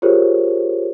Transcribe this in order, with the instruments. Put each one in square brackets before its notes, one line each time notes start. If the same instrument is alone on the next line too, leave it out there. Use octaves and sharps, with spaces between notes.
[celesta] F4 G4 G#4 A#4 C5 C#5